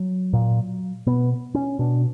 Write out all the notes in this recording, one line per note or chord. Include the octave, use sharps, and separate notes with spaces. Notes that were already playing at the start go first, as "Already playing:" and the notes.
Already playing: F#3
A#2
B2 B3
C#4
B2 D4